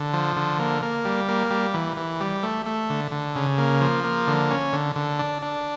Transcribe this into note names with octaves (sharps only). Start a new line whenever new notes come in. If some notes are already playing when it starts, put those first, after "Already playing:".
Already playing: D3
F3
D3
A#3
A#3
G3
A#3
G3
E3
E3
G3
A3
A3
D3
D3
C#3
A#3
F3
A#3
D3
C#4
D3
D3
D4
D4